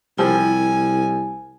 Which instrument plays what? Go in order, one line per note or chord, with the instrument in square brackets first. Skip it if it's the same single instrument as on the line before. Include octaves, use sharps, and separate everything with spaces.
[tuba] C2 [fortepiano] F3 G3 [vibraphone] E4 [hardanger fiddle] G#5